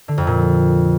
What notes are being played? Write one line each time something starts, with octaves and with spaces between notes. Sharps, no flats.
D3
F2
A#2